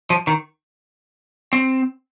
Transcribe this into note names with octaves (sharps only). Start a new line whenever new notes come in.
F3
D#3
C4